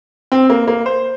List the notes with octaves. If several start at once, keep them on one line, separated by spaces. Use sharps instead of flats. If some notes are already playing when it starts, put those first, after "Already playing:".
C4
A#3
A#3
C5